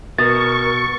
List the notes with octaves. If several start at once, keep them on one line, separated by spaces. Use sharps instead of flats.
B2 A#4 C#6 A6